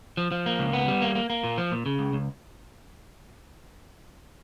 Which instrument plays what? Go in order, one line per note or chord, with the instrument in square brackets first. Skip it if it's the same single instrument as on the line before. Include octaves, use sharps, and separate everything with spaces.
[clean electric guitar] F3
F3
A#3
C#2
B3
G3
A#3
A#3
A#3
A#2
F3
A#2
C#3
C#2
C#2